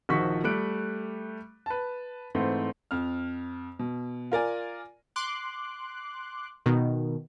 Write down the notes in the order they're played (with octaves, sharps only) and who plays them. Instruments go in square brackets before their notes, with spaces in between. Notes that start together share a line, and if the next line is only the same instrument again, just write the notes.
[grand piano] A#1 D#3 F3 F#4 C#6 B6
G3 A3 F#6 D7
B4 A5
G#2 E3 A3 C4
[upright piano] F2 F6
B2
F4 A#4 D5 G#5
[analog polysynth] C6 D6 F#6
B2 D#3